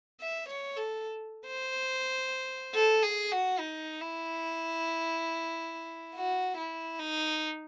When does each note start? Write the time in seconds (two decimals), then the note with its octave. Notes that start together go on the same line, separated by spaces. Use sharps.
0.21 E5
0.49 C#5
0.76 A4
1.47 C5
2.74 A4
3.03 G#4
3.32 F#4
3.59 D#4
4.02 E4
6.15 F#4
6.57 E4
7.00 D#4